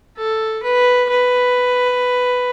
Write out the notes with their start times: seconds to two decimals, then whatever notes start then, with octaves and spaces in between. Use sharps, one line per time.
0.17 A4
0.63 B4
1.10 B4